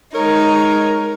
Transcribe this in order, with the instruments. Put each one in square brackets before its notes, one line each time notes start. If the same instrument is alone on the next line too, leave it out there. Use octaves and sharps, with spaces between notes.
[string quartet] G#3 D#4 [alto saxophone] A#4 [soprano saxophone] C#5 [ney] A#5